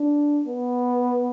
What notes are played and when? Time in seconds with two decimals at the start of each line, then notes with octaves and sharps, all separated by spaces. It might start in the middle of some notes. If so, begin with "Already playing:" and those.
Already playing: D4
0.47 B3